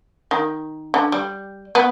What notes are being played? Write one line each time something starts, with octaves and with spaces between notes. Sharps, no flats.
D#3
D3
G3
B3